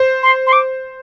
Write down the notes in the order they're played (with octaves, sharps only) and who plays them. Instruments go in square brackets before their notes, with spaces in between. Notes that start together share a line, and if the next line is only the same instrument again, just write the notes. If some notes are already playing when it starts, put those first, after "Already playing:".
Already playing: [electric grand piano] C5
[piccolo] C6
C6
D6